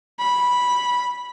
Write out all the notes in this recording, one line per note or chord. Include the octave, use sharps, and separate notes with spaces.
B5